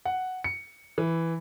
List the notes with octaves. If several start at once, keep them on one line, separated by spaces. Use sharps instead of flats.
F#5
C#7
E3